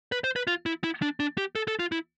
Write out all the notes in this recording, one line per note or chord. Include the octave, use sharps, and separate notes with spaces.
B4
C5
B4
F4
E4
E4
D4
D4
G4
A4
A4
F4
E4